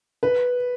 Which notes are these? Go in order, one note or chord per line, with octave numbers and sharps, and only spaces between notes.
B4